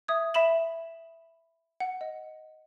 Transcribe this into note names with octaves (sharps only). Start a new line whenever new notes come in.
E5 D#6 G#6
E5 B5 E7 F#7
F#5
D#5